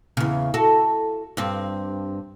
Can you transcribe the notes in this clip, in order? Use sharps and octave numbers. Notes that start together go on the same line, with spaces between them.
E2 C#3
F#4 A4
G2 C4